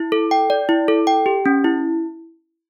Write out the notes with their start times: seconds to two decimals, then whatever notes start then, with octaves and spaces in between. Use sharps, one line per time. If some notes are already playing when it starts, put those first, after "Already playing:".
Already playing: E4
0.12 A4
0.31 G5
0.50 D5
0.69 E4
0.88 A4
1.07 G5
1.26 G4
1.46 C#4
1.64 E4